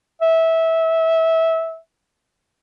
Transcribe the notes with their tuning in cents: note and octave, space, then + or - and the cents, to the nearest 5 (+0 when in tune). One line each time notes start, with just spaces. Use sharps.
E5 -20